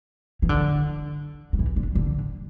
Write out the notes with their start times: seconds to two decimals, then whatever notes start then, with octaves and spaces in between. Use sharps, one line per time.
0.42 E3
0.49 D3
1.53 F#3
1.59 E3
1.76 D3
1.95 D3